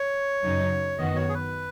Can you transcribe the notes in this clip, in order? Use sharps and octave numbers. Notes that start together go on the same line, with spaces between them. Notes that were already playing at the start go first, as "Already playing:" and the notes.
Already playing: C#5
F#2 C#3 F#3 D#4
F#2 D#3 B3 F#4 D#5
C#5
G#4
B4